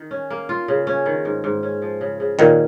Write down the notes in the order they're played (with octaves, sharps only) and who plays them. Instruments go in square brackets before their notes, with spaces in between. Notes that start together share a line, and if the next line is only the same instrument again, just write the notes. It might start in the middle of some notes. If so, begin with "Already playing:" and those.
Already playing: [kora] D#3
C#4
A#3
F4
C#3
C#4
D#3
G#2
G#2
C#4
F3
C#3
C#3
[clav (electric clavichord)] A#2 D#3 [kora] C#4